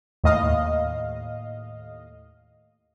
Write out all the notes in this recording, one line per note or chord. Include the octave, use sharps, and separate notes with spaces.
D#2 A2 D#5 F5